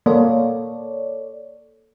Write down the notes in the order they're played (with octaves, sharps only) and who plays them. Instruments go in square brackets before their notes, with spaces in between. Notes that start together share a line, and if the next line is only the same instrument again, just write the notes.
[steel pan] A#3 [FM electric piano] A4 C#5 D5